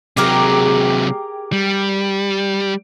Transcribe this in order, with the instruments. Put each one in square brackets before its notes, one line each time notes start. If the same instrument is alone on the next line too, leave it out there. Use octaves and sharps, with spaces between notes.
[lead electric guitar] C3 F#3 [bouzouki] G4 G#4 A#4
[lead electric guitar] G3